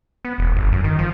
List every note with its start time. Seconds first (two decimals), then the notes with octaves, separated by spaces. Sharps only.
0.25 B3
0.38 E1
0.56 G1
0.73 F#2
0.84 D#3
0.99 F3